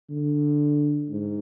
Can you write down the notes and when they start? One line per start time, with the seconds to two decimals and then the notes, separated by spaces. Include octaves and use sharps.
0.10 D3
1.09 G#2